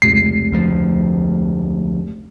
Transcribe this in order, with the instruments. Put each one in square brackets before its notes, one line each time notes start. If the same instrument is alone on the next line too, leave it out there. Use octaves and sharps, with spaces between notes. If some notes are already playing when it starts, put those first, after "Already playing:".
[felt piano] F1 C#2 [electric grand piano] C7
[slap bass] D2 F3